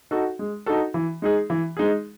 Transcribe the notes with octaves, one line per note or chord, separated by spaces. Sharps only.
D#4 F#4 A4
G#3
D#4 F#4 A4
E3
G#3 D#4 G#4
E3
G#3 D#4 G#4